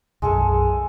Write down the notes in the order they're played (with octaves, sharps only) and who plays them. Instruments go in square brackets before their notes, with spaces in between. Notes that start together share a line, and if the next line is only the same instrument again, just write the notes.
[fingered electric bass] B1 F#2 [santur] G#3 G#4 A4